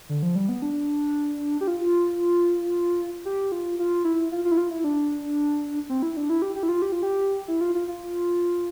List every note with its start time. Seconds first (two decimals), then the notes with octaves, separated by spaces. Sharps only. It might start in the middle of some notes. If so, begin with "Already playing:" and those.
0.09 D3
0.23 F3
0.36 G3
0.49 B3
0.62 D4
1.61 G4
1.68 F4
3.25 G4
3.52 F4
3.79 F4
4.05 E4
4.32 F4
4.45 F4
4.52 E4
4.57 F4
4.71 E4
4.84 D4
5.90 C4
6.03 E4
6.17 D4
6.30 E4
6.42 G4
6.56 G4
6.63 E4
6.69 F4
6.82 G4
6.92 F4
7.03 G4
7.48 E4
7.61 F4
7.75 F4
7.88 F4